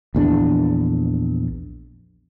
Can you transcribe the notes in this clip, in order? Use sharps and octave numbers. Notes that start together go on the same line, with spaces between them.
A#1 E2 C#4 D4